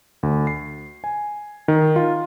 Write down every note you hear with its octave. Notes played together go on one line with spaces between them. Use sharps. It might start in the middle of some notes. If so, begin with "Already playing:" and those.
D2
C7
G#5
D#3
F4